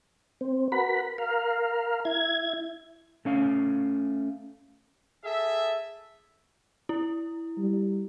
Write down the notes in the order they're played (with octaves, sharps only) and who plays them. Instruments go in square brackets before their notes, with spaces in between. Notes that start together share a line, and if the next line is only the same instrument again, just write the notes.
[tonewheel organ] C4
F#4 A#4 B4 B5
A#4 F5
E4 G#6
[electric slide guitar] A3 C#4 F5
[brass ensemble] G#4 A4 E5
[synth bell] E4
[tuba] G3